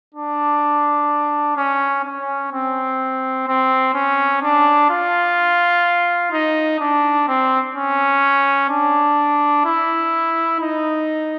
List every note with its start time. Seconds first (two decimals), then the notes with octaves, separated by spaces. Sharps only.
0.15 D4
1.57 C#4
2.05 C#4
2.52 C4
3.48 C4
3.94 C#4
4.42 D4
4.90 F4
6.32 D#4
6.80 D4
7.28 C4
7.75 C#4
8.69 D4
9.65 E4
10.60 D#4